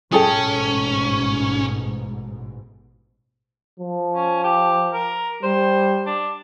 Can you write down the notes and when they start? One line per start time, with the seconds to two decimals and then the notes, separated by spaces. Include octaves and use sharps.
0.12 A1 G#2 B2 C#4 G#4 A4 G5
3.80 F3
4.15 C#4
4.44 G4
4.93 A#4
5.43 G3 C5
6.06 D4